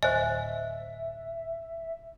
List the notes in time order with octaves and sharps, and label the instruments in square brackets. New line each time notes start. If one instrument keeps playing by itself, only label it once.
[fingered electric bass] D1 [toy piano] C5 G#5 [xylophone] D#5 [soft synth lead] E5